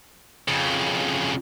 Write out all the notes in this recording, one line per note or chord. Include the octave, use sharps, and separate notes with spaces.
F2 C#3